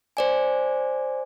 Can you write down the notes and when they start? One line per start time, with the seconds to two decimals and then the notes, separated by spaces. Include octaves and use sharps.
0.17 C5 D5 G#5